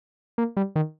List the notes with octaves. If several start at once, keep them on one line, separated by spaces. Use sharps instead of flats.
A#3
G3
D#3